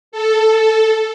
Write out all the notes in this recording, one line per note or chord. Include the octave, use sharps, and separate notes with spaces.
A4